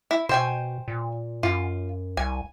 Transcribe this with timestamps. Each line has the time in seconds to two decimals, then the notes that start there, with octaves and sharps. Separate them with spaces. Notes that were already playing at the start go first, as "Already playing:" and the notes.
0.11 E4
0.29 B2 C5 G5 G#5
0.88 A#2
1.43 F#2 F4
2.17 C2 G#5